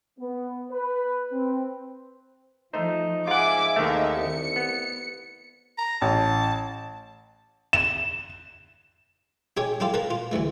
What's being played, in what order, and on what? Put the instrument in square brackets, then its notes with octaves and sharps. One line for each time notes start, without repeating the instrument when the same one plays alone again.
[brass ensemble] B3
B4
C4
[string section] F3 [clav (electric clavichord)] A3 C5 [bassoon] D#4
[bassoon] G#2 [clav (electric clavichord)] F4 F#5 [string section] E5 G#5 D6
[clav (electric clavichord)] D#2 D#3 A3 [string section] D#4 E5
[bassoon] C2 [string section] C#7
[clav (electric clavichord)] B3
[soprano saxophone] A#5
[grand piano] A1 [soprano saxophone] A5
[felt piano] E7
[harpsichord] D#4 G4 G#4 C#5
D4 E4 F4 G4 A4
A#4 B4 A5 B5
F4
D2 G2 E3 A3